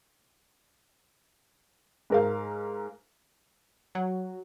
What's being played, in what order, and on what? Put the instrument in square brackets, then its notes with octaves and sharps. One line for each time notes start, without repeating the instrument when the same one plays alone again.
[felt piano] G#2 A#4 F5
[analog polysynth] F#3